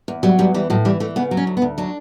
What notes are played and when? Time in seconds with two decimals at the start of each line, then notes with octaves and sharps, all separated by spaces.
0.08 E2
0.23 F#3 G3
0.39 E2 G3
0.54 E3 G3
0.70 A2 F#3
0.85 E3 G3
1.00 E3 A3
1.16 C#3 B3
1.31 F#3
1.37 C#4
1.47 D2
1.57 B3
1.62 D2
1.78 F#3 D4